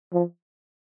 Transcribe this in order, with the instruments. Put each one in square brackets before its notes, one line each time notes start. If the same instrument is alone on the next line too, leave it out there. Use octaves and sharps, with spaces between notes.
[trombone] F3